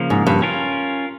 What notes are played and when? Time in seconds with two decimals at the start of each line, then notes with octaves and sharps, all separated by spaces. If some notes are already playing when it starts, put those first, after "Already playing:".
Already playing: C#3 F3 A#3
0.10 G#2
0.27 G2
0.42 C#4 F4 A#4